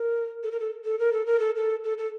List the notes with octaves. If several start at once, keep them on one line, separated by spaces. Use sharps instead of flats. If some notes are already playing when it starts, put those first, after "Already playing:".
Already playing: A#4
A4
A#4
A4
A4
A#4
A4
A#4
A4
A4
A4
A4